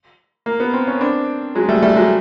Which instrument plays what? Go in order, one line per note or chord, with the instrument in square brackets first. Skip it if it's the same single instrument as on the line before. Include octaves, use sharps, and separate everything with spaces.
[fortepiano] A#3
B3
C4
C#4
C4 D4
F#3 G#3
G3 A3
G3 A3
F#3 G#3